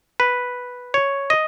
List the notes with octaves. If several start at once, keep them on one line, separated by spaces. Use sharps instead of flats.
B4
C#5
D#5